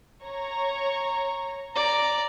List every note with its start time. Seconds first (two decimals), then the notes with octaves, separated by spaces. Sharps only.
0.25 C#5 A#5 C#6
1.76 D5 A#5